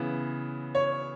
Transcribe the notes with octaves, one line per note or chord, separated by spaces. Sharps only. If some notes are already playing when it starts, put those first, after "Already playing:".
Already playing: C#3 E3 B3
C#5